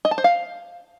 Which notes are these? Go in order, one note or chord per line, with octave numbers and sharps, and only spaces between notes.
D#5
A5
C5
F5